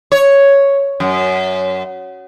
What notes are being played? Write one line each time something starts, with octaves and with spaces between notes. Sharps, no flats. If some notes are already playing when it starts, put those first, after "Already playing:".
C#5
F#2